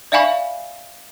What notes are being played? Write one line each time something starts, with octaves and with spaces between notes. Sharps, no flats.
D5 E5 F5 G#5 B5 C#6